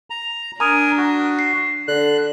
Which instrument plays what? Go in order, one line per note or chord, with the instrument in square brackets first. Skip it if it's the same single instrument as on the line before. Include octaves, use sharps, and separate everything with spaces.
[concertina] A#5
[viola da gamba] D4 [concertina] A#4 G#5 [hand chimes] A#5 D#6
[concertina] F#4
[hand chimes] C7
[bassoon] D3 [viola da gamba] D4 [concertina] F#6